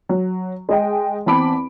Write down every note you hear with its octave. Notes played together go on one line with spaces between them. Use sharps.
F#3
G#3 D#5 G5
E2 C4 A5 B5 D6 D7